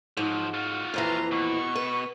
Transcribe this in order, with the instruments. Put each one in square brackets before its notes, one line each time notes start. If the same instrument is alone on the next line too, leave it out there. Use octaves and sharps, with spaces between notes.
[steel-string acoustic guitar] G#2 [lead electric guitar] F3 F#3
[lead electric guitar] F4 F#4
[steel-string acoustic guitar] F2 A#2 E3 [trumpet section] B4 A#5 C6
[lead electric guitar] B2 [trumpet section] C#6
[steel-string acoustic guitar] B4